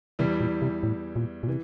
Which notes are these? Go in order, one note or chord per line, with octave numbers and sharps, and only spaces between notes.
E2 C3 E3 G3
A#2
C3
A2
A#2
A#2
C3 E3